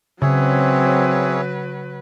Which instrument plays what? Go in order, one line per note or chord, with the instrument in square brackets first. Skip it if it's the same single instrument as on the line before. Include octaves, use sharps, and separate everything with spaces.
[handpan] C#3 [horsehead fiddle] F#3 B4 [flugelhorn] C4 [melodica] G#4 C#5 E5